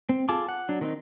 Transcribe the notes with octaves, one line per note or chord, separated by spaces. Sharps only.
C4
F4 G#4 A4 A5 D6
F#5
F#3 D4
D#3 C4 D#4